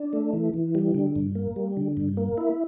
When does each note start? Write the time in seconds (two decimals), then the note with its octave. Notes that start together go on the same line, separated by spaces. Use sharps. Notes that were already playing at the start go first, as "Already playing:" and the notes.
Already playing: D4
0.13 A3
0.33 E3
0.54 E3
0.75 G3
0.95 D3
1.16 G2
1.35 A#3
1.56 G3
1.77 D3
1.97 G2
2.17 A#3
2.38 E4